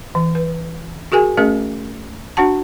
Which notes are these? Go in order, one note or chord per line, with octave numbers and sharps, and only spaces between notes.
E3
B4
F#4 G#4 A#4 G#5
A3 C#4 G#4 A#4 D#5
D4 F#4 F#5 A5